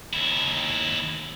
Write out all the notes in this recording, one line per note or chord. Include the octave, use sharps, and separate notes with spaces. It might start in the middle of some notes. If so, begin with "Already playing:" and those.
D#2 E4